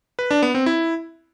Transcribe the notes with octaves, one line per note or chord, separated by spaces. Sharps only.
B4
D4
B3
C4
E4